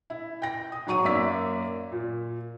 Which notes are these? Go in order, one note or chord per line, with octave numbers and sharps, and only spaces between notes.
E4
G5 A#6
D#6
G#2 F#3 A#5 C#6 D#7
F#2 A#3 D5 E5 E6 B6
A#2